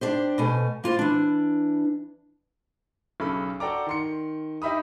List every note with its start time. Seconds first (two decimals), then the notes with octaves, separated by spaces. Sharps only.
0.01 D4 G4 C5
0.38 B2 A3 G#5
0.84 A#3 F4 C5
0.99 E3 D4
3.20 B1 C#3 A4 B5
3.60 F#4 A4 D5 G5 A#5 D6
3.86 D#3 C6 C#7
4.62 D#4 G4 E5 B5 D#6